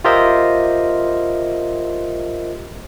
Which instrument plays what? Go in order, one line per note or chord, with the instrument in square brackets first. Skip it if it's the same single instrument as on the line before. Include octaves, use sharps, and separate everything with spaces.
[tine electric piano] F4 G4 A#4 C5 D#5 E5